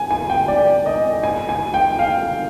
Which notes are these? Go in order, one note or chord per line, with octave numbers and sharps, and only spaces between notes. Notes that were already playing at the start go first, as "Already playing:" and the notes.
Already playing: G#5
G#5
G5
D5
D#5
G#5
G#5
G5
F5